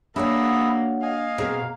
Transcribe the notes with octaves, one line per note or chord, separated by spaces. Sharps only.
A#3 D4 F#4 G#4 C#5 E5 F#5 B5
D#5 F5 G#5
B2 A#3 C4 G#4